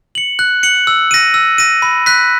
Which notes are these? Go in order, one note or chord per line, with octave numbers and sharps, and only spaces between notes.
C#7 F#7
F#6
C#7 F#7
E6
A#6 D#7
E6
A#6 D#7
B5
F#6 B6